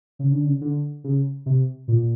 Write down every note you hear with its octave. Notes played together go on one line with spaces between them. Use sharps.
C#3
D3
C#3
D3
C#3
C3
A#2